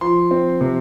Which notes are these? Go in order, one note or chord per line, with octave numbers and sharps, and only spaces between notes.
F3 C6
C4
C3